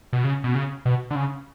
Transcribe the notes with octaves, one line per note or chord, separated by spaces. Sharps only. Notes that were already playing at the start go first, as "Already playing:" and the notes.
B2
C#3
B2
C#3
B2
D3
C#3